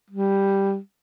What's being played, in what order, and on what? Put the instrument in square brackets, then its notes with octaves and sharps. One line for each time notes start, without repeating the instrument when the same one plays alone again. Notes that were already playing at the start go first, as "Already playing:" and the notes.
[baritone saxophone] G3